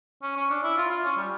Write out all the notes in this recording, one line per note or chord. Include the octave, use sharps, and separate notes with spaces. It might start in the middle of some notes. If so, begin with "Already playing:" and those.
C#4
C#4
D4
E4
F4
F4
C#4
G3